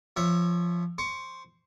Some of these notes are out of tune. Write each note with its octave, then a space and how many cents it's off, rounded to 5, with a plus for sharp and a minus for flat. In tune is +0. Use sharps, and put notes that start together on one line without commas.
F3 -10 C#5 +0 E5 +10
C5 +0 C#6 +20